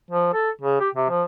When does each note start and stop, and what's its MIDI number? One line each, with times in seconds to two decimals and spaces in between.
0.11 0.29 53
0.34 0.50 69
0.61 0.80 49
0.80 0.89 67
0.95 1.09 48
1.09 1.23 53